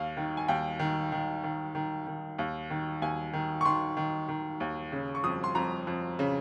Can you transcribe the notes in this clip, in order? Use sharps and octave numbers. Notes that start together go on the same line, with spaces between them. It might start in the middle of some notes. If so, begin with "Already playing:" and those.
Already playing: D#2 F5
D#3
G#5
D#2 G5
D#3
D#3
D#3
D#3
D#3
D#2
D#3
D#2 G#5
D#3
C#6
D#3 C6
D#3
D#3
D#2
C#3
C#6
F2 D#6
C6
F2 A#5
F2
C#3